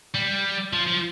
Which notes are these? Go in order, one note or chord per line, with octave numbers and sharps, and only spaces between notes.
G3
F3
F3